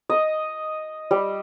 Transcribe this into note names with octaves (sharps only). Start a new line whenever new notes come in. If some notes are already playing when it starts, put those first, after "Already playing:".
D#5
G3